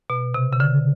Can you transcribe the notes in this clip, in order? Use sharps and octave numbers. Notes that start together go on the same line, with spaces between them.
B2
C3
C#3
D3